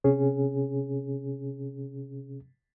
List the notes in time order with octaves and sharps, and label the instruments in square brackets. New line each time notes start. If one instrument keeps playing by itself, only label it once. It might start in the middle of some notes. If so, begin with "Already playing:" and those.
[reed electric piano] C3 C#4 G#4